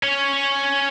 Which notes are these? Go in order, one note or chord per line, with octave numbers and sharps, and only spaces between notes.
C#4 C#5